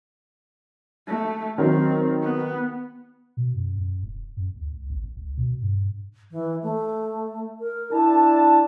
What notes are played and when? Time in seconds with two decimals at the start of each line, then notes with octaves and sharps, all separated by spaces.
1.07 A3
1.58 D#3 F#3 C4
2.23 B3
3.37 B2
3.55 F#2
3.76 F#2
4.03 E1
4.37 F#2
4.55 D2
4.72 C#2
4.90 A1
5.03 G1
5.17 C#2
5.38 B2
5.62 G2
6.31 E3
6.63 A3
7.60 A#4
7.92 D4 E4 A5